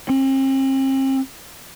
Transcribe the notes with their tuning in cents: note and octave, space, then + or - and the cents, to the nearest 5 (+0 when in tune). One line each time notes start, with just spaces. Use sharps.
C4 +40